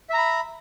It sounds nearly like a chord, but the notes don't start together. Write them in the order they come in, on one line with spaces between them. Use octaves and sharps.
E5 A#5 B5